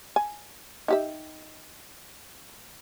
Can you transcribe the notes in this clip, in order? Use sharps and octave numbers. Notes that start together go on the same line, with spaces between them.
G#5
D#4 G4 E5